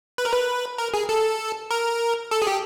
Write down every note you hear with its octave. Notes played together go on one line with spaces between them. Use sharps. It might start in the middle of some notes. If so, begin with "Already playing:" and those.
B4
A#4
B4
A#4
G#4
A4
A#4
A4
G#4
G4